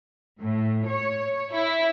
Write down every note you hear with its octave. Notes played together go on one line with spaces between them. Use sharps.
A2
C#5
E4